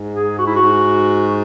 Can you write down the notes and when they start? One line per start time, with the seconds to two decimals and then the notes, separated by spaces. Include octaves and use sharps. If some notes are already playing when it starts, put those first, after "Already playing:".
Already playing: G#2
0.14 G#4
0.38 F#4
0.47 E4
0.56 F#4
0.62 G#2